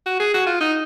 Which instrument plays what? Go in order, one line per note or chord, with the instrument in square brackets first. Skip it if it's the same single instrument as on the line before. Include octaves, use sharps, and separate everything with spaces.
[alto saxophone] F#4
G#4
F#4
F4
D#4